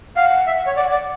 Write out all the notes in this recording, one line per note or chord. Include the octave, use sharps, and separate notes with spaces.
F5 F#5
E5
C#5
D5 F#5
D5 F#5